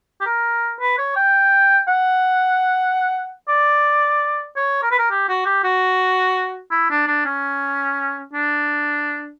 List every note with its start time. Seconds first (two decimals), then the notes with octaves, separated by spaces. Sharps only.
0.21 G4
0.26 A#4
0.80 B4
0.98 C#5
1.16 G5
1.88 F#5
3.49 D5
4.57 C#5
4.83 A#4
4.91 B4
4.99 A#4
5.11 G4
5.29 F#4
5.46 G4
5.64 F#4
6.71 E4
6.90 D4
7.07 D4
7.26 C#4
8.33 D4